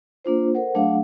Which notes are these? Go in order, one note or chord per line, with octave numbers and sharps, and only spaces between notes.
A#3 D4 F4 C5
A4 A#4 C5 F#5
F#3 A3 D4 G#4 F5 F#5